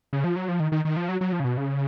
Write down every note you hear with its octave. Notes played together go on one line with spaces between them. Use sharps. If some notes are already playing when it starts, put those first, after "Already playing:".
C#3
F3
F#3
F3
D#3
D#3
D#3
F3
F#3
F#3
F3
C#3
B2
C#3